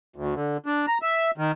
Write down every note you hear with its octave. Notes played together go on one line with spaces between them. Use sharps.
D2
D3
D4
A#5
E5
D#3